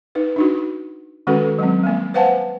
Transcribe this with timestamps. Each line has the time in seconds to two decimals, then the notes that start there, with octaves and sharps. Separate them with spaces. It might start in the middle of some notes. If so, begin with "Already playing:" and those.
0.15 D#4 B4
0.36 D4 D#4 F#4
1.27 D#3 G#3 C#4 F#4 A4 B4
1.59 F#3 G#3 C4
1.83 G3 G#3 A#3
2.14 B4 C5 F5 F#5 G#5 A5